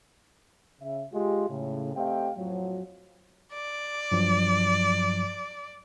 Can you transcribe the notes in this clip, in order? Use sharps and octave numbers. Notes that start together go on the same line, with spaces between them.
C#3 E5
G#3 F4 G4
A2 C#3
A3 C4 G4 D#5 F5 G5
F2 A2 F3 F#3
D5
G2 F3 F#3